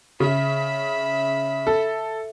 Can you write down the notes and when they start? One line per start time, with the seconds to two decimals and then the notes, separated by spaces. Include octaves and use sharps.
0.20 C#3 E5 B5
1.67 A4